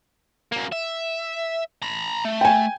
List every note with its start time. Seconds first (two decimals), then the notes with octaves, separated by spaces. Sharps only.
0.52 F#2 A#3
0.72 E5
1.82 A#5 B5
2.25 A3
2.41 G5 G#5